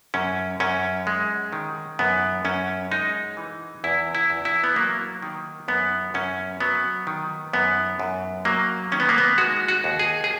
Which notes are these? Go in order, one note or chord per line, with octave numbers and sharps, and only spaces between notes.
F#2 C#4
F#2 C#4
G#3
D#3
F#2 B3
F#2 C#4
G#3 D#4
E3
E2 E4
E4
E2
E4
B3
F#3 A#3
D#3
F#2 B3
F#2 C#4
F#3 B3
D#3
F#2 B3
F#2
F#3 A#3
D#3 C#4
B3
A#3
B3
G#3 F#4
F#4
D#2
G#4
G#4